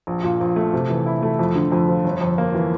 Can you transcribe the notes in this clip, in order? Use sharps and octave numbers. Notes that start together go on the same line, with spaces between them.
A#1
A#2
A#1
A3
C3
E3
E4
A3
F2
D3
F2
F3
G1
F2
A#3
E3